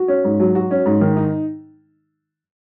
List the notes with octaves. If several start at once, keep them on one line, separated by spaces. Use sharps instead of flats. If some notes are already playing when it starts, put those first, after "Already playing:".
Already playing: F#4
C#4
G#2
F#3
F#4
C#4
G#2
D#3
D#4